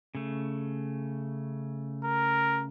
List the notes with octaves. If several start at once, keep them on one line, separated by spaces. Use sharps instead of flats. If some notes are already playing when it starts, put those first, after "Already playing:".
C#3 A3
A#4